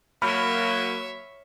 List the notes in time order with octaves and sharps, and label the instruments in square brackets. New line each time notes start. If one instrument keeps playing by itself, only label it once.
[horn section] F#3 A#3 [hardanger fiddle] C#5 E5 [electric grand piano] B5 F6